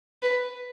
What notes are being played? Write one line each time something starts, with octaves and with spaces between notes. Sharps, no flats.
B4